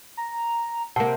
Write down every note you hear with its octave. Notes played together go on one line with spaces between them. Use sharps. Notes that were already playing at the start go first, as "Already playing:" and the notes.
A#5
C3 A#3 F#5 A5